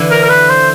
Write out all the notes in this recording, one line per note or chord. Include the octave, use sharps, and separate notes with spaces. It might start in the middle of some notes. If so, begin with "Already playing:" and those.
Already playing: D3 E3
A#4
A#4
B4
C5